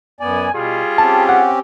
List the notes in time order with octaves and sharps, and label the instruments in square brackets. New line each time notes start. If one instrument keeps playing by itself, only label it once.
[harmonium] F#2 B3 D5 [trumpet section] G#5
[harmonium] B2 [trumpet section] G3 F4 G#4
[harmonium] C4 C#4 G4 [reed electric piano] A5
[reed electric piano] F#5